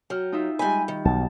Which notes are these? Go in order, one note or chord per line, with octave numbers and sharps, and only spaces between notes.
F#3 G5 F6
D#4 F4 E5
G3 G#3 G5 G#5 B5
D#3
B1 A5